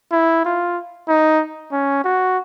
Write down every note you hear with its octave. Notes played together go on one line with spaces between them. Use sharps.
E4
F4
D#4
C#4
F#4